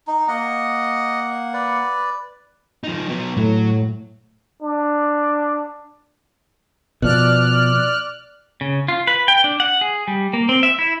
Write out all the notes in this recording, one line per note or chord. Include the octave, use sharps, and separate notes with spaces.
D#4
A#3 D#5 F#5
B4 D5
F3 D#4
F#3 B3
A2 F#3
D4
B2 F3 D5 F6 F#6
C#3
F4
B4
G5
D4
F#5
G#4
G3
A#3
C4
E5
E4